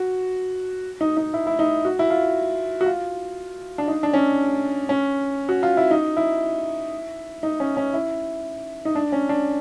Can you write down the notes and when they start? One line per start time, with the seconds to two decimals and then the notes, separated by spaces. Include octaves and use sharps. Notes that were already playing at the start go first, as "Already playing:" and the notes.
Already playing: F#4
1.01 D#4
1.17 D#4
1.34 E4
1.47 E4
1.59 D#4
1.85 F#4
1.99 E4
2.10 F4
2.81 F#4
2.86 F4
3.78 D4
3.88 D#4
4.03 D4
4.13 C#4
4.89 C#4
5.49 F#4
5.63 F4
5.77 E4
5.91 D#4
6.17 E4
7.43 D#4
7.60 C#4
7.77 C#4
7.94 E4
8.85 D#4
8.95 D4
9.12 C#4
9.29 D4